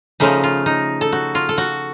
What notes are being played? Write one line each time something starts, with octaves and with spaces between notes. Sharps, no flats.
C#3 F3 A3 D#4
F4
D#4
A4
F#4
F4
A4
F#4